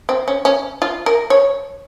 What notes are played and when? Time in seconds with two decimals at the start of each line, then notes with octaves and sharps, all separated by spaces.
0.09 C4
0.28 C#4
0.45 C#4
0.82 F4
1.06 A#4
1.30 C#5